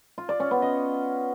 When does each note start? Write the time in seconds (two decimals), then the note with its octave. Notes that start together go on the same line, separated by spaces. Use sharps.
0.18 F4
0.29 D5
0.40 C#4
0.51 B3
0.62 D#5